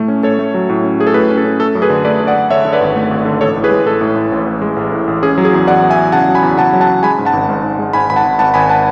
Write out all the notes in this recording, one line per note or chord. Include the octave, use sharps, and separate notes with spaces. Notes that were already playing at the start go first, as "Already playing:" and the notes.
Already playing: A2 A3
C#4
A3 A4 C#5
A3
F#3
A2
C#4
A3 G#4
A4
A2 G#4 B4
C#4
A4
C#4
A3 A4
F#2
G#4 B4
D3
A3 B4 D5
D3
D5 F#5
A3
D3 C#5 E5
D3
B4 D5
G#1
A3
G#1
D3
A1 A4 C#5
A2
G#4 B4
G#3
A2 A4
A2
A2
A1
A1
G#3
A1
A2
A1
C#4 G#4
F#3
G#4
E2
E2 D5 F#5
E2
E5 G#5
E2
C#3 F#5 A5
F#3
G#5 B5
E2
C#3 F#5 A5
F#3
F#5 A5
C#3
G#3 G#5 B5
G#2
F#5 A5
G#1
G#2
G#1
G#3
G#2 G#5 B5
G#1 B5
F#5 A5
G#1
G#1 F#5 A5
G#1 G#5 B5
F#5 A5